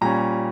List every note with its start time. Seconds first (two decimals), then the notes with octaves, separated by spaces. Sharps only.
0.01 A#2 G3 C#4 A#5